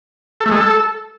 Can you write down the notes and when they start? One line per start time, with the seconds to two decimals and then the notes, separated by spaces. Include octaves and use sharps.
0.41 A4
0.46 A3
0.51 G#3
0.56 A4